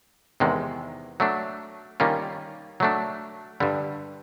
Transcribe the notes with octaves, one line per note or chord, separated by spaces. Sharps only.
E2 C3 D#3 G#3
F#3 A3 D4
D#3 G3 A#3 C#4 F4
F#3 A3 D4
G2 D3 G3